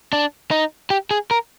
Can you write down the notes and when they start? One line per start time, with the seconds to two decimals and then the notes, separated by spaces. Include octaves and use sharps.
0.13 D4
0.51 D#4
0.90 G4
1.11 G#4
1.31 A#4